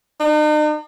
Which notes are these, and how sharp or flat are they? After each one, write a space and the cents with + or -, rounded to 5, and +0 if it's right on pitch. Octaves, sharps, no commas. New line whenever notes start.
D#4 -45